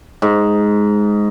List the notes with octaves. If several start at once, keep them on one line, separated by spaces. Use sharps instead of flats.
G#2